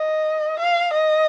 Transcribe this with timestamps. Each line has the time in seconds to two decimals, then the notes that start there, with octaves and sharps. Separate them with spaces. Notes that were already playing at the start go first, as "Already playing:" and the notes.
Already playing: D#5
0.60 F5
0.94 D#5